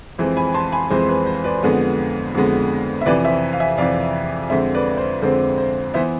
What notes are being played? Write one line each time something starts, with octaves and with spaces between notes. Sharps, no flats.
F2 E3 G#3 C4 C5
G#5 B5
A5 C6
G#5 B5
F2 E3 G#3 C4 C5
B4
C5
B4 D5
F2 D3 G#3 B3
F2 D3 G#3 B3
E5
F2 C3 E3 B4 D5
C5 E5
F5
E5 G#5
F2 C3 E3 D5 F5
F2 D3 G#3 C4 C5 E5
B4 D5
C5
F2 D3 G#3 C4 C5
C5
E3 B3 C5 E5